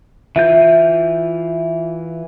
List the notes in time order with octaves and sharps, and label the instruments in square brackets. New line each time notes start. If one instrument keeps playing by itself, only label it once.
[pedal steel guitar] E3 F4 G6 [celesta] E5